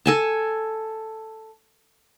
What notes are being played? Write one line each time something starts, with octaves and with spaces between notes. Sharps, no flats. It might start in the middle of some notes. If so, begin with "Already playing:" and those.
A4 G#5 A5